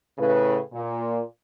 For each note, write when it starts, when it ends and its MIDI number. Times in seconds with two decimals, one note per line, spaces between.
0.18 0.58 45
0.18 0.58 49
0.18 0.58 71
0.72 1.20 46